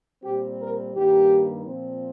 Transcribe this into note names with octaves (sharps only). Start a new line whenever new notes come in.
A#2 G3 C4 G4
A#4
G2 D#3 G3 A#3 G4
A#2 F3 C4